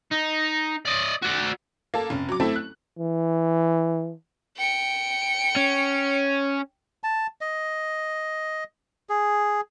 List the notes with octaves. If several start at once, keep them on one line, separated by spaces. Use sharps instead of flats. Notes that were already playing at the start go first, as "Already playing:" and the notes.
D#4
D5 D#5
F#4 D5
A#3 A4
F1 C#4
F#3 D6
A3 C4 E4 A4
F#6
E3
G5 C#7
C#4
A5
D#5
G#4